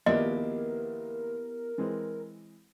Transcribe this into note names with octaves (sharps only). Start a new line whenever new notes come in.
A#1 D#2 B3 E4 G4 A#4 D5 D#5
E3 G#3 C4